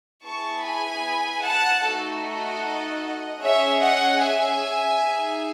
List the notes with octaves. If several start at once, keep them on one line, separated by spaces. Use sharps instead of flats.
B3 E4 G#4 A5 C#6
G#5 B5
F#5 A5
A3 D#4 F#4 A4
D#5 F#5
C#4 G#4 C#5 E5
D#5 F#5
E5 G#5
D#4 G#4